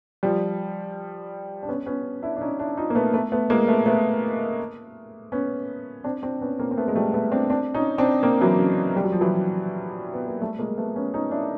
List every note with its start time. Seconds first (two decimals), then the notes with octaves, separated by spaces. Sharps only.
0.23 F3 G3
1.63 D4
1.68 B3 C#4
1.86 B3 C#4
2.23 D4 E4
2.36 D4
2.41 C#4 D#4
2.59 D4 E4
2.77 D#4 F4
2.90 A#3
2.95 A3 B3
3.14 A3 B3
3.32 A3 B3
3.50 G#3 A#3
3.68 A3 B3
3.86 A3 B3
5.32 B3 C#4
6.04 C4 D4
6.23 C4 D4
6.41 B3 C#4
6.59 A#3 C4
6.71 C4
6.77 A3 B3
6.88 G#3
6.95 G3 A3
7.13 A3 B3
7.32 C4 D4
7.50 C4 D4
7.74 C#4 D#4
7.98 C4 D4
8.23 A#3 C4
8.41 E3 F#3
8.59 C#3
8.96 G3
9.04 F#3
9.12 F3
9.21 E3 F#3
10.13 B3
10.27 A#3
10.41 G3 A3
10.59 G#3 A#3
10.77 A3 B3
10.96 B3 C#4
11.14 C#4 D#4
11.31 D4 E4